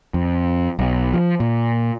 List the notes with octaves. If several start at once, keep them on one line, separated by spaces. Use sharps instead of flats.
F2
B1
F3
A#2